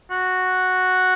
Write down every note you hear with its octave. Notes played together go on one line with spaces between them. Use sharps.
F#4